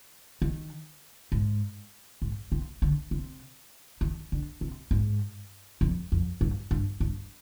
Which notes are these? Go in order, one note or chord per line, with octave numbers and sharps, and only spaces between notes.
D#3
G#2
G#2
C3
D3
C3
D#3
D3
C3
G#2
F2
F2
G2
G2
G2